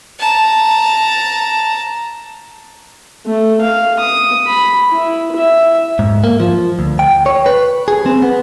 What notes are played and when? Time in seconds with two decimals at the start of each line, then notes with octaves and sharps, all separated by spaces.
0.19 A5 A#5
3.26 A3
3.61 F5
4.00 D#6
4.47 B5
4.92 E4
5.36 E5
5.99 G#2
6.24 A#3
6.40 F3
6.79 D2
6.99 G5
7.26 C#5
7.46 B4
7.88 G#4
8.06 C4
8.22 B3